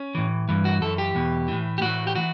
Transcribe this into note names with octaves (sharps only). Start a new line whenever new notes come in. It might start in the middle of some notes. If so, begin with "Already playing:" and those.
Already playing: C#4
A2 E3
G2 E3
F#4
F#2 E3 A4
G4
E2 B2
A2 E3
G4
A2 E3 F#4
G4
E3 F#4